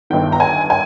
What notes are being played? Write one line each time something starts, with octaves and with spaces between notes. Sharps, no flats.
G1 G2 D#3 G5
A#5
G#5
G#5